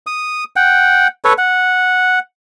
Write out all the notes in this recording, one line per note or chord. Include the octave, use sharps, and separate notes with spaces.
D#6
F#5 G5
A4 B4 C#5
F#5